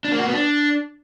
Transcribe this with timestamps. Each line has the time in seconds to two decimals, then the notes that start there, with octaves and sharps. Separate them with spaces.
0.05 D4
0.12 A#3
0.19 F#4
0.26 B3
0.34 D4